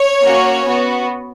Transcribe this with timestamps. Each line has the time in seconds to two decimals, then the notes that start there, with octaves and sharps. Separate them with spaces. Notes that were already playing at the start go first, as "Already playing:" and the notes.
Already playing: C#5
0.22 A#3 C#4 F#4
0.65 B3 F#4